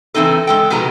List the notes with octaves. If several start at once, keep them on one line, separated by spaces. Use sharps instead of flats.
E3 A3 C4 D#4 A4
G#3 A4 G5
B2 D#3 F3 G#3 B3 A#5